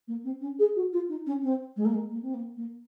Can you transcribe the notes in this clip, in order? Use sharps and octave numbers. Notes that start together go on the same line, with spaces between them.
A#3
C4
C#4
G#4
F#4
F4
D#4
C#4
C4
G#3
A#3
G#3
A#3
C4
A#3
A#3